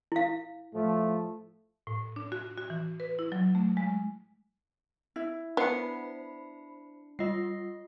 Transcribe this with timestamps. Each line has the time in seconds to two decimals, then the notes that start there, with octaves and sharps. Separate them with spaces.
0.12 E4 F5
0.74 A2 F3 A3
1.87 A2
2.16 D4
2.32 F#4
2.57 F#4
2.70 E3
3.00 B4
3.19 E4
3.32 F#3
3.55 A3
3.77 G#3
5.16 E4
5.57 B3 D4 C5 B5 C7 C#7
7.19 G3 F4 D#5 C7